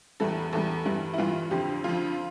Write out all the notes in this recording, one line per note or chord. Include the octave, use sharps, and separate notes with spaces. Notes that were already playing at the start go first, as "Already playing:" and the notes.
E2 E3 G3 A4
E2 E3 G3 A4
G2 E3 G3
E4
G2 E3 G3 F4
F2 D3 F3 G4
F2 D3 F3 F4